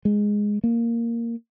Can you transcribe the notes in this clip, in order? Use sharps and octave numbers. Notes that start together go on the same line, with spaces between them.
G#3
A#3